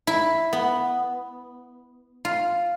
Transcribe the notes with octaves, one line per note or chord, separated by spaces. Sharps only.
E4
B3
F4